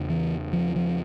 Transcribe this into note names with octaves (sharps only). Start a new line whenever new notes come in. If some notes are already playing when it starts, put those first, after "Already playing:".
Already playing: E2 C#3
E3
F3
F3